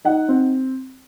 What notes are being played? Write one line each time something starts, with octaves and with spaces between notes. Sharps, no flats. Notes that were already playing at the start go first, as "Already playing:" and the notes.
D#4 F#5
C4